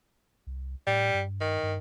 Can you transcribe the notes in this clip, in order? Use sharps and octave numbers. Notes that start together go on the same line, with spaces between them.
C2
A2 G3
G2
D#3
G2